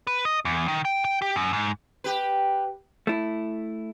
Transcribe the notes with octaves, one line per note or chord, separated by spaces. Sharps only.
B4
D#5
E2
D#3
G5
G5
G4
F#2
G#2
G4 B4
A3 E4